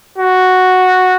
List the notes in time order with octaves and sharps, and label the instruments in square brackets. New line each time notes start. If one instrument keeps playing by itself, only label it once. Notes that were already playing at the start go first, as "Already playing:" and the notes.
[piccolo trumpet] F#4